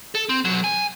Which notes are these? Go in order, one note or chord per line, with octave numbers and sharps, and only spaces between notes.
A4
C4
B1 F#3
G#5